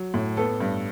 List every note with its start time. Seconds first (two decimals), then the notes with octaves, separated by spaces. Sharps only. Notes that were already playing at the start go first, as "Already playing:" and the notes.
Already playing: F#3
0.14 A2
0.37 B3 A4
0.60 G2